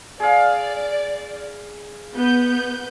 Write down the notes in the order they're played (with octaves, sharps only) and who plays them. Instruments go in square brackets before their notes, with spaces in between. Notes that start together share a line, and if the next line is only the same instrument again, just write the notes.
[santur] G#4 F5 [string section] D5
[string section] B3 G6